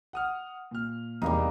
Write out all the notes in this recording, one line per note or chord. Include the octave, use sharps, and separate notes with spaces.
F#5 D#6 F6
A#2 F6
E2 C3 G3 A#3 D#4